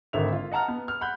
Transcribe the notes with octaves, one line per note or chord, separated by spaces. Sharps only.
G#1 D3 A#4 C5 E5 F7
F4
D#5 F#5 A5 A#5 F6
B3
F6
F#5 B5 F#6 G6